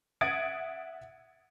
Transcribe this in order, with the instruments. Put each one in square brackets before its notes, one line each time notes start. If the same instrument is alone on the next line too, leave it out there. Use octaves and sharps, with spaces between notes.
[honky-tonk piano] E5 F#5 D#6 G#6 A6 D7